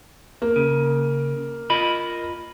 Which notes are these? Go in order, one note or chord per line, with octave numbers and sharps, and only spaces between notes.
A#3
C#3
F4 D#5 B5